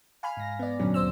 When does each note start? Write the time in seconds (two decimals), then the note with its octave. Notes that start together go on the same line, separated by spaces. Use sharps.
0.23 F5 G#5 B5 F6
0.37 G#2 A#6
0.59 B3 D5
0.79 F#2 A#2 D3 F#3 C#4
0.94 D2 C5 E6